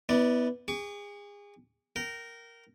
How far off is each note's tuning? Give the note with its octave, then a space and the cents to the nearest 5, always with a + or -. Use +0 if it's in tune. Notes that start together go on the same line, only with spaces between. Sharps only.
B3 +0 E4 -35 D5 +0
G#4 -30 C#6 +35
A#4 +0 G5 -30